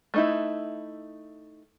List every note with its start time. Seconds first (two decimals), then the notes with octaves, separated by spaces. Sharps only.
0.14 A3 D#4 E4